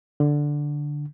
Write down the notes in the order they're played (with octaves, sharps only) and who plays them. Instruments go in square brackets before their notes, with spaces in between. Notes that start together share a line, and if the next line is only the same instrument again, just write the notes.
[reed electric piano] D3